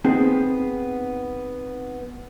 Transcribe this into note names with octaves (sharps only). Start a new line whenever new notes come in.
B3 C4 D#4 G#4